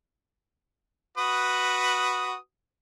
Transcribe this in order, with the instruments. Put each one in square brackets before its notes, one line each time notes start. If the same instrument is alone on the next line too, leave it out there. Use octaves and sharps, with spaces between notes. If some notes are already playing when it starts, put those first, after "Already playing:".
[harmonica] F#4 B4 D#6